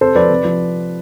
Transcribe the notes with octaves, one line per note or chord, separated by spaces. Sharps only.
C3 A4 C5
F3 B4 D5
C3
F3